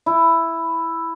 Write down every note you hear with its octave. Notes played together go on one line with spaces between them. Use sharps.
E4